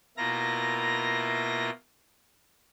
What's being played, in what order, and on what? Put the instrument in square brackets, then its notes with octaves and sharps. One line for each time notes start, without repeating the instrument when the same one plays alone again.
[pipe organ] B2 A#3 E4 F4 A#5 A#6